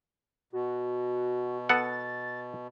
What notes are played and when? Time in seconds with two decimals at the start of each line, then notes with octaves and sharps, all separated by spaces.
0.53 B2 F#4
1.69 B3 A4 F#5 A6